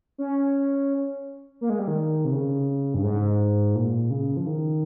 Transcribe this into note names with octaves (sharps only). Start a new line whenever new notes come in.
C#4
A#3
G#3
G3
D#3
C3
C#3
G2
G#2
A#2
C#3
F3
D#3